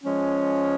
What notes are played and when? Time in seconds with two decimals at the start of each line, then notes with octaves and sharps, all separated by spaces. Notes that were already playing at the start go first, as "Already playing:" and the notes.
0.04 F3 G#3 C#4